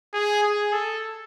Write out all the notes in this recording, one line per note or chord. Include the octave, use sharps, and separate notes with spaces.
G#4
G#4
A4